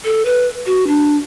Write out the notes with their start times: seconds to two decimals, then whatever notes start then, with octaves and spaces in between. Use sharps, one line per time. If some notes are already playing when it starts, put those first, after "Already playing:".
0.05 A4
0.25 B4
0.66 F#4
0.87 D4